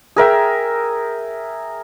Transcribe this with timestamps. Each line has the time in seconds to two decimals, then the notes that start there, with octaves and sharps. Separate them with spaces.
0.16 G#4 A#4 E5 G5